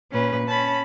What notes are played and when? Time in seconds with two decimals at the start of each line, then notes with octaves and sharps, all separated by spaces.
0.12 A#2 C#4 B4
0.47 C#4 A5 B5